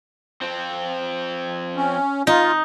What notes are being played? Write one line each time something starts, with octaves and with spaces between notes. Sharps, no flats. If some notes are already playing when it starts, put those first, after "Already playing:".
F3 C4
C#4
D#4 F4